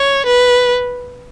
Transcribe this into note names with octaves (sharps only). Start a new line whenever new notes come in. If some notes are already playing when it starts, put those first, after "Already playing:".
Already playing: C#5
B4